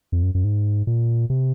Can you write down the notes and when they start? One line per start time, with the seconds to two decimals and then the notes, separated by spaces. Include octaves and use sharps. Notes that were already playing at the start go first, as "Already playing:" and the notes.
0.12 F2
0.23 F#2
0.35 F#2
0.44 G#2
0.87 A#2
1.30 C3